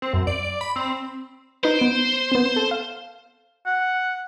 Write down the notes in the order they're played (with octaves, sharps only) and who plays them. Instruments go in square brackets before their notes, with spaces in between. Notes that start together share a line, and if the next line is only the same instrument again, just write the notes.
[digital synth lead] C4
F#2
D5
D5
B5
C4
[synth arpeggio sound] D#4 B4 [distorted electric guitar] C5
[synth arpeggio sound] B3 D7
B3 C4
A4
F5
[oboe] F#5